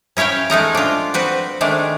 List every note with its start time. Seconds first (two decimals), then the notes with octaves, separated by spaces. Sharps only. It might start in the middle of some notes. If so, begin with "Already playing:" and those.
0.17 C#4 E4 C#5 F5 G5
0.50 G#3 A3 D#4 A#4
0.75 D4 F4
1.14 C4 F#4 B4
1.61 D#3 G#3 A3 D4